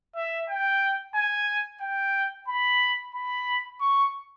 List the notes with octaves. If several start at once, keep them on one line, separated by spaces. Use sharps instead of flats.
E5
G5
G#5
G5
B5
B5
C#6